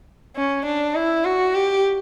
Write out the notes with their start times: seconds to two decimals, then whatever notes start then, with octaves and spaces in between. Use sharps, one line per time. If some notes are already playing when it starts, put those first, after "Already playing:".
0.36 C#4
0.65 D4
0.95 E4
1.25 F#4
1.55 G4